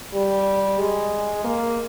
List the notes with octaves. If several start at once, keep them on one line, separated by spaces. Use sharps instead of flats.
G3
G#3
A#3